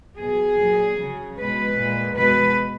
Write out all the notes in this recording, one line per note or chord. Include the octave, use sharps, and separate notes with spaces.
B2 F#3 G#4
A#2 F#3
C#3 F#3
B2 G#3 B4
A#2 G#3
B2 G#3 B4